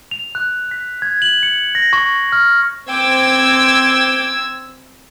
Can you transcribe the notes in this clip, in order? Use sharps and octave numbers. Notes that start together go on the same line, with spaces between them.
F7
F#6
B6
G#6
F#7
C#7
A#6
C#6
F6
C4 G5 D6 E6 G#6